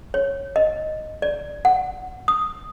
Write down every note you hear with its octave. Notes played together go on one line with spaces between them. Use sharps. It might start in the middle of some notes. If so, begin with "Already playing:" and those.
C#5
D#5
D5
F#5
D#6